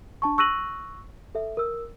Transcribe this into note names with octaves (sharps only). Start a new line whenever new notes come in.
D4 A5 C#6
C#6 E6 F#6 A#6 D#7 F#7
A4 E5
A#4 E6